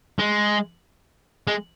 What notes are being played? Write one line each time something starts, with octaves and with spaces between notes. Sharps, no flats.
G#3
G#3